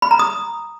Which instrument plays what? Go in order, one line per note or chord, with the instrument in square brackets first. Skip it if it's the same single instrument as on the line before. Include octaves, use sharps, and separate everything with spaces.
[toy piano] B5
A#5
D#6